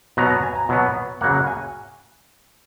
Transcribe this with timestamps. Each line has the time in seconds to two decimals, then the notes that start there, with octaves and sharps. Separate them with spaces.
0.17 B2 F#3 B3 A#5
0.30 A#5
0.43 G#5
0.56 A#5
0.69 B2 F#3 B3
1.21 C#3 F#3 A#3 F#5
1.35 F#5
1.47 G#5